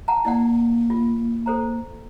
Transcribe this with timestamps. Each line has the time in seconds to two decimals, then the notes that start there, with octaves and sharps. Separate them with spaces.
0.08 F#5 A5 A#5
0.25 A#3 E4 D5 F#5
0.90 F4
1.46 A4 C5 A#5